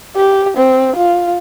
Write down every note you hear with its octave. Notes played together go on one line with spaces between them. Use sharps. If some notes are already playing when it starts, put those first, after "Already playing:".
G4
C4
F4